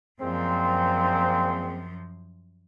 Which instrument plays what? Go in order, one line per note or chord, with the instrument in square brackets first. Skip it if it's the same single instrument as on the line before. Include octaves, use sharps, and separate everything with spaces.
[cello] F#2 F3 [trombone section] A#2 G#3 C4